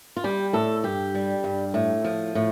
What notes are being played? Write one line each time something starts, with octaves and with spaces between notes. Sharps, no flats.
F4
G3 G4
A2 A4
G2 G4
G3
G2
A2
F3
A2